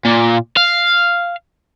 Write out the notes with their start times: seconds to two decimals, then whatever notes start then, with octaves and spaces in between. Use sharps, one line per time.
0.05 A#2
0.57 F5